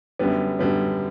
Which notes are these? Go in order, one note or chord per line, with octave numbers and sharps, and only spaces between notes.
F#2 D3 G3 B3
F#2 D3 G3 B3